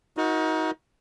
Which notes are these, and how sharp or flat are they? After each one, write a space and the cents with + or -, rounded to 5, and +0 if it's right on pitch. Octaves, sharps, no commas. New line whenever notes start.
D#4 +30 F#4 -15 A#4 +25